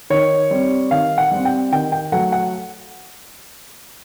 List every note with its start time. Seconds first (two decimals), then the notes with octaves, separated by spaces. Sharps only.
0.10 D#3 C#5
0.51 G3 C4
0.91 D#3 F5
1.18 F#5
1.31 G3 C4
1.45 G5
1.72 D#3 G5
1.92 G5
2.12 F#3 A3 F#5
2.32 F#5